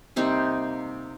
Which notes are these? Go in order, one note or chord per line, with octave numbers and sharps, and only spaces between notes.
C3 G3 A#3 C4 D#4